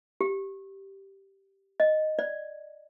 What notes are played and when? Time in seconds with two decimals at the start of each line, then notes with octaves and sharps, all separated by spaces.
0.21 G4
1.80 D#5
2.19 D5